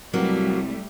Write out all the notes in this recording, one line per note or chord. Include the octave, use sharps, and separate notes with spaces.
C2 F#3 G3 A3 A#3 F#4